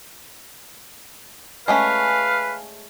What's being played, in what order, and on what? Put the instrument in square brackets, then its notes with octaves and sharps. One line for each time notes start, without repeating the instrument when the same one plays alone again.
[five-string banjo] G#3 A3 C#4 [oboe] B4 [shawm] F5